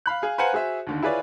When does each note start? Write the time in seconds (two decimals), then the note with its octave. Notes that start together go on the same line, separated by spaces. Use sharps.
0.06 F5 B5 F#6
0.22 G#4 F5
0.38 B4 C5 F5 F#5 G#5 A#5
0.53 F#4 G#4 C5 E5
0.87 D#2 D3 D#3
1.03 E4 F4 G#4 B4 C#5 D5